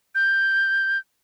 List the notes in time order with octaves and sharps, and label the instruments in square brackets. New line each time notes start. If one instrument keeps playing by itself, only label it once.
[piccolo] G6